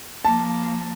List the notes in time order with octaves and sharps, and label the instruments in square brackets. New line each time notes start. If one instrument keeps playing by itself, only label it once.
[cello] F3 A#3 [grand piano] A5